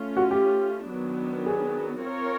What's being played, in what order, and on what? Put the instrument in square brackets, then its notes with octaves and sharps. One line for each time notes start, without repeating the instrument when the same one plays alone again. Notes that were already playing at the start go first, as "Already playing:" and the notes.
Already playing: [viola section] A3 C#4 F4
[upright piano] F#4
G4
[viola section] D#3 F#3 B3 D4
[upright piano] G#4
[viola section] C4 F4 A#4 C#5